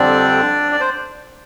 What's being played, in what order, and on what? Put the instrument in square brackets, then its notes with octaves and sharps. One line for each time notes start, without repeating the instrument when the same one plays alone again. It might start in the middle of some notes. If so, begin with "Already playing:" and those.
Already playing: [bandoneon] F2 D3 G3 C4 D4 D5
D5
C5